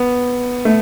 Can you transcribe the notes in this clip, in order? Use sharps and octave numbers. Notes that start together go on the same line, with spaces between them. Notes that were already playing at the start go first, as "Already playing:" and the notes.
Already playing: B3
A3